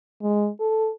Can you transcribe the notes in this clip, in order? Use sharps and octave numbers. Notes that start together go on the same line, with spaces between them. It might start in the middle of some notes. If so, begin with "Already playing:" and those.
G#3
A4